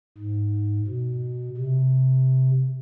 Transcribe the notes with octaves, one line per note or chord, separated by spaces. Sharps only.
G#2
B2
C3